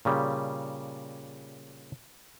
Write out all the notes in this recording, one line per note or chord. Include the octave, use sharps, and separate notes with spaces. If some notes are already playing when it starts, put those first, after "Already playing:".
A#2 C#3 G3